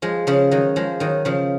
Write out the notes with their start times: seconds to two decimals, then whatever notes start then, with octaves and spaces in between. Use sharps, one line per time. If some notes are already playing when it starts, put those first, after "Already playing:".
0.02 F3 G#3
0.27 C#3 F3
0.51 D#3 F#3
0.76 F3 G#3
1.00 D#3 F#3
1.25 C#3 F3